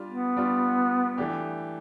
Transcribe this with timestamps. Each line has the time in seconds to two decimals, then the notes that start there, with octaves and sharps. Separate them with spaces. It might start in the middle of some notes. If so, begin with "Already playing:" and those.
Already playing: G3 D4 F4
0.10 B3
0.37 G3 D4 F4
1.18 E3 A3 D4 G4